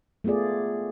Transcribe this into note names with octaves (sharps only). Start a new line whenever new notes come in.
A3 B3 F4 G#4 D5